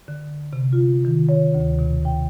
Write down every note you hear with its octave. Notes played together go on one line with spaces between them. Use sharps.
D3
C3
F4
D#3
C#5
D2
B2
G5